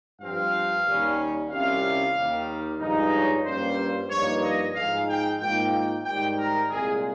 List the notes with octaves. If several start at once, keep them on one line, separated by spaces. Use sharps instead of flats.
G2 F3 C4 F5
D#2 D#3 G3 C#4
C2 C3 G3 C#4 F4 F5
D#2 D#3 G3
G2 F3 G#3 D#4
C#5
G2 G3 A#3 C#4 F4 C5
G2 F3 A#3 D#4 C#5
D#5
G#2 F3 G#3 D#4 F5
G5
G#2 D#3 A#3 F4 G5
G5
G#2 D#3 G3 G5
A#4
C2 A#2 G#3 G#4